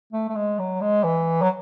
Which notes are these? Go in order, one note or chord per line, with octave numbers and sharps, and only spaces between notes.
A3
A3
G#3
F#3
G#3
E3
F#3